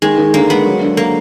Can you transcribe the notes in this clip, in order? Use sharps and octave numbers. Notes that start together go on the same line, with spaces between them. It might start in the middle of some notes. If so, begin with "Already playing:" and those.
D#3 G#3
D#3
D3 A#3
G#3 B3
F#3
D3
A#3